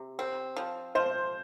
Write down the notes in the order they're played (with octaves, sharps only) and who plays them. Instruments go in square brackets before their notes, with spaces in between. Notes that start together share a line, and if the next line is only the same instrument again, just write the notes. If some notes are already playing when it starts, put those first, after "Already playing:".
Already playing: [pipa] C3
C4
F3
[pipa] F3 [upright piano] C5